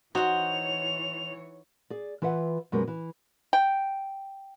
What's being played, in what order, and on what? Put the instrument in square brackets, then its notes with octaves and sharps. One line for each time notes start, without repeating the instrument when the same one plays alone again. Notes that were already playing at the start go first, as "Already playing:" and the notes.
[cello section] E3 C#5 [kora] D#4 F#4 [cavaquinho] C5 F#5 [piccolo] F7
[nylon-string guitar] G#4 D5
E3 F4 B4 E5 F#5
F#2 B2 G3 G#3 B3 A#4
E3
[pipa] G5